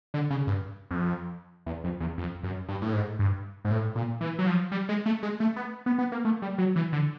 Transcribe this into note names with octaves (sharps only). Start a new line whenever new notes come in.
D3
C#3
G2
F2
E2
F2
E2
F2
F#2
G2
A2
G#2
G2
G#2
A2
A#2
E3
F#3
F3
G3
G#3
A3
G#3
A3
B3
B3
B3
A#3
A3
G3
F#3
E3
D3